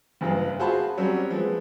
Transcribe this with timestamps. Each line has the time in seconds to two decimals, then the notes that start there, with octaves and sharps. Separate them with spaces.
0.21 F#1 G2 F4 B4
0.59 F4 F#4 G#4 C5 A5 B5
0.98 F#3 G3 C4 C#4
1.31 F3 G#3 B4